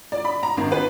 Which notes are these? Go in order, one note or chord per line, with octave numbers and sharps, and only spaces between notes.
D5
B5
A#5
G#1
B4